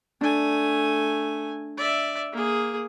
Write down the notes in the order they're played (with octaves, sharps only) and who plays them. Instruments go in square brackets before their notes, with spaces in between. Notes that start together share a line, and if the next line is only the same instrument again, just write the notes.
[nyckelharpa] A3 G#5 [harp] D4
[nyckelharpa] D5 E5
A#3 G#4